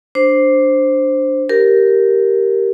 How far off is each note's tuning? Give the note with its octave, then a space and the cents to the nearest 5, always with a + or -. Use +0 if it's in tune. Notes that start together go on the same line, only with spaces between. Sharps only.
D4 +0 C5 +0
G4 -5 A#4 +0